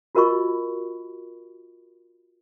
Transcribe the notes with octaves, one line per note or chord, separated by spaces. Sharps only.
F4 F#4 A#4 D#5 B5 C#6